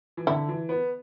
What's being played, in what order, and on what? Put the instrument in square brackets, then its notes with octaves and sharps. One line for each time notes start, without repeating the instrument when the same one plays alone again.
[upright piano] E3
[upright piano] D3 [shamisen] E4
[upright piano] E3
B3